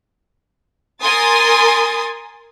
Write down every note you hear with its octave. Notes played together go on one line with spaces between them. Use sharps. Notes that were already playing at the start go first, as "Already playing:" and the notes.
A#4 G#5 C6 D#6 A6